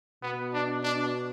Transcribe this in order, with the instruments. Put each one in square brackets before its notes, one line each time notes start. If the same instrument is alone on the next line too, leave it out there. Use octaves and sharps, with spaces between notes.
[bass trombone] B2 [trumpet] B3
[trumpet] D4
D4